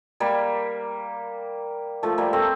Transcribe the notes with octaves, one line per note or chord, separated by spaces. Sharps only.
G3 A#3
F3 A3
G3 A#3
A3 C4